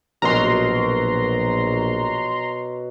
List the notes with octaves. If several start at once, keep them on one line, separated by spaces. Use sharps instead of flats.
A#1 B2 F#3 A#4 A#5 C6